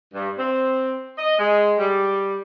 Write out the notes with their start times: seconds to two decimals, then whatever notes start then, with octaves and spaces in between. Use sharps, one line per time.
0.14 G2
0.38 C4
1.18 D#5
1.39 G#3
1.78 G3